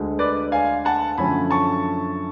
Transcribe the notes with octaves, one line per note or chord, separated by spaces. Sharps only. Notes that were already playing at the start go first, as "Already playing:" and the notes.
Already playing: D2 D3 G#3
B4 D5
F5 G#5
F#5 A5
F#2 D3 F3 A3 C#4 G#5 B5
A5 C#6